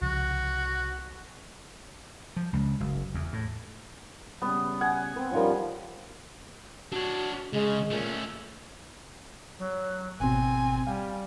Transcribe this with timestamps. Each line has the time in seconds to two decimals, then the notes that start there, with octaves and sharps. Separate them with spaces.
0.01 C2 C#3 F3 F#4
2.37 F3
2.53 C#2
2.80 F#1
3.14 E2
3.33 A2
4.42 C#3 G3 B3
4.81 F#5 G#5
5.16 C4 B4
5.31 F3 G3 C#4 D#4 F4 A#4
6.92 D4 F#4 C#5
7.53 C#3 G#3
7.90 A#2 A3 C#4
9.59 F#3
10.20 G#1 B2 C4 G#5
10.87 G3 F5 G5